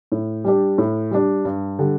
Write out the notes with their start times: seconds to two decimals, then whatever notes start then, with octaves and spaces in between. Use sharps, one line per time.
0.12 A2
0.44 G3 D4 G4
0.78 A2
1.11 G3 D4 G4
1.45 G2
1.79 D3 G3